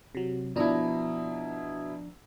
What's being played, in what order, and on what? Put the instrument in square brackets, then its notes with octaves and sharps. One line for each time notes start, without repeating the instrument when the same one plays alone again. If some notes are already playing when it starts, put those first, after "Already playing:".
[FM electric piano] C3 F#3
[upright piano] B2 E4 [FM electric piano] F3 D4 A#5